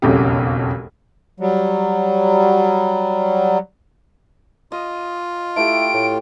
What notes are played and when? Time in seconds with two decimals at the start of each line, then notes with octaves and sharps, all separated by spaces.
0.02 E1 B1 F2 C#3 G4
1.40 F#3 G3
4.72 F4 D#5
5.56 A3 E4 G4 D7
5.94 A2